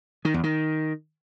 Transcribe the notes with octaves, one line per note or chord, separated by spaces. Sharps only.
D#3
E2
D#3